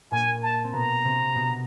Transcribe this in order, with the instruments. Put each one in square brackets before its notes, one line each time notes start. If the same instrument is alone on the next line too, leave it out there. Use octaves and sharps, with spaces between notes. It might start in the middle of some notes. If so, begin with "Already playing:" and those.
[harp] A#2 A#3 [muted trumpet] G#5
[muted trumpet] A5
[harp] C4
[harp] B2 B3 [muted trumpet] A#5
[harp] C3 C4
B2 B3